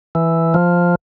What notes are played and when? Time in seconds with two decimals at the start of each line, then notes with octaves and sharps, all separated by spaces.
0.15 E3
0.54 F3